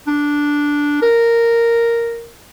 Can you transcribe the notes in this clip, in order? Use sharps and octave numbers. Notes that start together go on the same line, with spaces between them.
D4
A#4